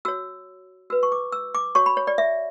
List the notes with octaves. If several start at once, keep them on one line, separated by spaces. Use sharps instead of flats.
F#4 C#5 E6
F#4 B4 E6
C#6
D6
E6
D6
F#4 C#5 C#6
B5
C#5
D5
E5